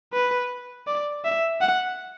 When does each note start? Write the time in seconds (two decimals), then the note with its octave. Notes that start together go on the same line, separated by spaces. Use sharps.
0.13 B4
0.87 D5
1.25 E5
1.61 F#5